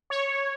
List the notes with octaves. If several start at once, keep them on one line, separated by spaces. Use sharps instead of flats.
C#5